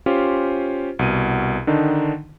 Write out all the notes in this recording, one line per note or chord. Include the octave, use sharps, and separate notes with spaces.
C#4 F4 G4 C5
C2 B2 D#7
D3 D#3 D4 D#4